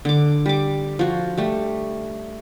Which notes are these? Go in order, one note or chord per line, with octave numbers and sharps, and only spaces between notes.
D3 D6
G3 D6
F3 F#4
G3 A3